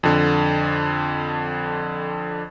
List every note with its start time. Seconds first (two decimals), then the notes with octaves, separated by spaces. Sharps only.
0.03 F2 D3